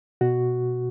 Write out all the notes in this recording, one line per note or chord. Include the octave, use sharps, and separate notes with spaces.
B2 F#4